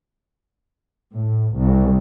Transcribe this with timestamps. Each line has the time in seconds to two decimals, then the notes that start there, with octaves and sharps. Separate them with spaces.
1.15 A2
1.57 C2